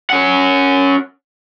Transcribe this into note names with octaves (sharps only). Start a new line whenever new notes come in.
C#4 F#5